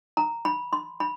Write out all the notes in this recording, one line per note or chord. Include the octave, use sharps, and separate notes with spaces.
A#5
B5
C6
B5